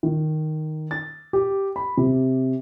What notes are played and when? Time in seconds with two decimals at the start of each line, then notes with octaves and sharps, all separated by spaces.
0.03 D#3
0.91 A6
1.33 G4
1.76 B5
1.97 C3